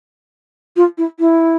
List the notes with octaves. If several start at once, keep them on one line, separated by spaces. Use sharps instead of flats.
F4
E4
E4